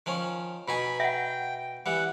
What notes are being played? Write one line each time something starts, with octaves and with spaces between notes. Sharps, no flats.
D#3 F3 C#4
B2 D#4 G#5 B5
E5 F#5 G5
E3 G3 F#5